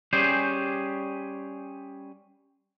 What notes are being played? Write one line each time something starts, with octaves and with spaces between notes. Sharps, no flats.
G3 C#4 G4 G#4 C5